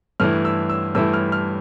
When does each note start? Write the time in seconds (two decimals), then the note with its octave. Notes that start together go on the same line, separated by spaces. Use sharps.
0.20 G2 E3 A3 E4 F6
0.45 E6
0.69 E6
0.95 G2 E3 A3 E4 E6
1.13 F6
1.32 F6